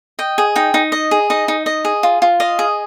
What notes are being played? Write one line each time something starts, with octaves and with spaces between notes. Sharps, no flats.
D#5 G5
G#4
D#4 G5
D#4
D#5
G#4
D#4 D#5
D#4
D#5
G#4
F4
F4
D#5 F5
G#4